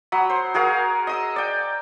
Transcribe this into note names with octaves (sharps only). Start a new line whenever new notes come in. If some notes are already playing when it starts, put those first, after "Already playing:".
F#3 B5 D#6
C5
F#4 G#4 A#4 F5
D#5 D#6 E6
D5 G5